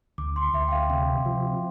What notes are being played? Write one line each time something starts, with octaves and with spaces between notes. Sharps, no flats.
D2 D6
C6
D2 E5
G5
F5
C3 G5
F3